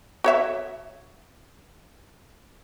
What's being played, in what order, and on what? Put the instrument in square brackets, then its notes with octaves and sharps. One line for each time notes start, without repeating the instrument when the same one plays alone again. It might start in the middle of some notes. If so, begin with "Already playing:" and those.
[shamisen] F#4 C#5 E5